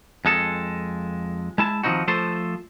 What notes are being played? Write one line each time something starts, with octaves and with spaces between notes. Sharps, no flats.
F2 G#3 A4
G#3 E4 A5
D#3 F3 G#3 C4 D#4 F#4
F3 A3 A4 C5